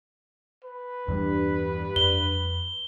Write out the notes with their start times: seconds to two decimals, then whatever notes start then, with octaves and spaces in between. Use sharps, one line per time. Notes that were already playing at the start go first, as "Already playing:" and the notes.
0.65 B4
1.08 E2 G2 E3 G3
1.96 F2 G7